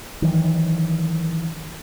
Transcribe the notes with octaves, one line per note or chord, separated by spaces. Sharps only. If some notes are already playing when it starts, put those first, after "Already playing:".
D#3 E3 F#3